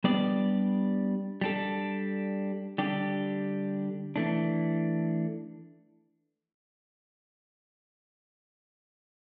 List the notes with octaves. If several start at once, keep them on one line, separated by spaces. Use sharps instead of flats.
G3 B3 D4 G4 D5
G3 D4 A4
D3 G3 D4 G4
E3 A3 D4